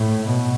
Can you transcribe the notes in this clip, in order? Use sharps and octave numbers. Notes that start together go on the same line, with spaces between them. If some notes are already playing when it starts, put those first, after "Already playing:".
Already playing: A2
B2